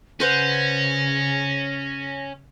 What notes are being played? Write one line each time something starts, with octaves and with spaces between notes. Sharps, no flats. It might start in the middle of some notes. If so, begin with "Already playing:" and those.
C#3 C#4 B4 C5 F#5 A#6